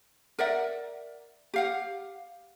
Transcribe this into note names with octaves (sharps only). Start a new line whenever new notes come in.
A#4 D5 E5 F#5
G4 F5 F#5